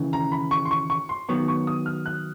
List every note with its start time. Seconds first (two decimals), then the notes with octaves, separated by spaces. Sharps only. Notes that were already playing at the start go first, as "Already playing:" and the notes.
Already playing: D#2 C#3 E3
0.13 A#5
0.32 B5
0.51 C#6
0.65 C6
0.71 C#6
0.90 C#6
1.09 C6
1.29 D#3 F#3 B3 C#6
1.48 C#6
1.67 D#6
1.86 F6
2.06 F#6